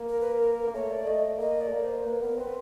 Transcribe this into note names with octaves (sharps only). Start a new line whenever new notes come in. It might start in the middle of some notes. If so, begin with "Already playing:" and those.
Already playing: A#3
A#4
B4
A#4
A#3
A3 C#5
D5
A3 D#5
A#3 D#5
D5
A3
A#3
C5
A#3 B4
B3 A#4
C4 B4